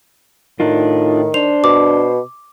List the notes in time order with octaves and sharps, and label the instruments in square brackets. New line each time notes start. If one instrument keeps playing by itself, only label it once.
[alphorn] A2 [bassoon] D#3 [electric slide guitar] D4 D#4 F4
[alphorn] D4 [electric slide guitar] C5 [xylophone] F7
[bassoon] B2 [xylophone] D6